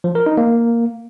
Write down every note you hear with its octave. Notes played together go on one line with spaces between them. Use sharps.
F3
A#4
D#4
A#3